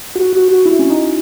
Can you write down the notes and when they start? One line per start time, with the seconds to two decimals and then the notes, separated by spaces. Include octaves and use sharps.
0.15 F#4
0.33 F#4
0.48 F#4
0.66 E4
0.79 C#4
0.90 D#4